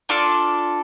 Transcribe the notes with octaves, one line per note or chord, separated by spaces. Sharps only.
D4 F4 A4 D6